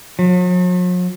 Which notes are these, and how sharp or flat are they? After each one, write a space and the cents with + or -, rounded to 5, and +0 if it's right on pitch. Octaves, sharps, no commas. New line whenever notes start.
F#3 -45